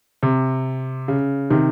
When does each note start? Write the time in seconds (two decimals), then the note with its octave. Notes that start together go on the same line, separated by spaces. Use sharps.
0.23 C3
1.08 C#3
1.50 C3 D#3